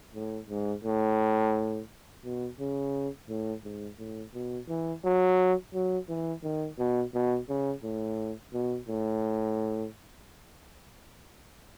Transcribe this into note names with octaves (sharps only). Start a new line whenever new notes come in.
A2
G#2
A2
B2
C#3
A2
G#2
A2
B2
E3
F#3
F#3
E3
D#3
B2
B2
C#3
A2
B2
A2